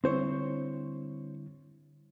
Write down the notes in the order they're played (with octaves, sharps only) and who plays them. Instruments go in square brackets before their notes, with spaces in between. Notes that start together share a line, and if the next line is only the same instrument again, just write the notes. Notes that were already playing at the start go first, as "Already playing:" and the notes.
[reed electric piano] D3 G3 E4 [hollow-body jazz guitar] C4 C5 C#5